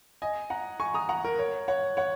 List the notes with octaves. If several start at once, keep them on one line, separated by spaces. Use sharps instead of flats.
D#5 G#5
F#5 A#5
G#5 C#6
A#5 D#6
F#5 A#5
A#4
C#5
C#5 F#5
C#5 F#5